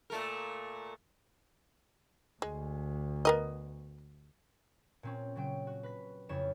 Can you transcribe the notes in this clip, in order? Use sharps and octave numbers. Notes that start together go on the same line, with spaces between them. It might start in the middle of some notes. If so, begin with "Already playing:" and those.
A#2 A3 A#4
D2 G#3
B3 A#4 D#5
A#2 C4 C#4
C#3 F#3 G5
F#4
B4 B6
F2 C#3 E4 C#5 E7